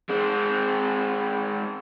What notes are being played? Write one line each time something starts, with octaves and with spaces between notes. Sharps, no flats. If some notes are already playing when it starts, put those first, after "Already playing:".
G#3 C4